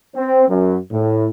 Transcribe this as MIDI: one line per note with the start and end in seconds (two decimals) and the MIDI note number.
0.15 0.47 60
0.49 0.77 42
0.91 1.28 45